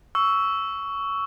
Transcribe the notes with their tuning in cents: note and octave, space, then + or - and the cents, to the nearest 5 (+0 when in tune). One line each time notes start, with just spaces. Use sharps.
C#6 +15 E6 +0